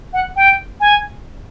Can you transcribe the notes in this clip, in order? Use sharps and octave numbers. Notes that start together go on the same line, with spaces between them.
F#5
G5
G#5